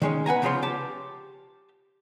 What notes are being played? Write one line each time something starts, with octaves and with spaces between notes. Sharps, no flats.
D#3 G#3 C#4
B4 F#5 G#5 A#5
C#2 C#3 F3 F4 C#5 C6
G4 A5